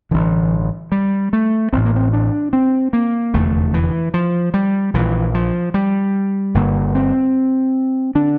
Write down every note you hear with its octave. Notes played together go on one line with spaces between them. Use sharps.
A1 G2 D3 E3
G3
A3
A1 A2 C4
A#3
C4
D4
C4
A#3
F1 E2 D3 A3
E3
F3
G3
A#1 A#2 E3
F3
G3
G1 G2 D3 A#3
C4
D3 D4